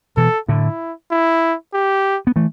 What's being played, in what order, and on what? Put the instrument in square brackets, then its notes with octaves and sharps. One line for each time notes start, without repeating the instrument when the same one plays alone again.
[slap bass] B2 E3 [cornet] A4
[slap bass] A2 D3 [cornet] E4
[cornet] E4
G4
[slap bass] B3
E3 A3